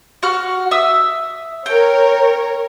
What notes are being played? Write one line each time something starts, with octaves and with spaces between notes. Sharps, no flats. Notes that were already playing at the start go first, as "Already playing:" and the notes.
F#4 F#5 F6
E5 D#6 E6
A#4 C#5 G5